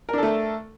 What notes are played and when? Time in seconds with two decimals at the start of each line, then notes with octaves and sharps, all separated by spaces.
0.09 A#4
0.13 D4
0.18 A4
0.23 A3